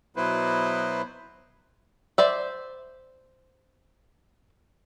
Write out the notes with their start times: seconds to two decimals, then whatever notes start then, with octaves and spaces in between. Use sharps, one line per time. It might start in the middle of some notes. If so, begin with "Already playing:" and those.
0.16 B2 F#3 B3 E4 B4 C5
2.18 C5 D5 E5